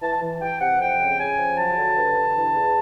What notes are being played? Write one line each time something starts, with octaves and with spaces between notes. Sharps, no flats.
E3 A5
E3
E3 G5
C3 F#5
F2 G5
C#3
C#3 G#5
F3
F#3 A5
D3
G2
D3
E3
E2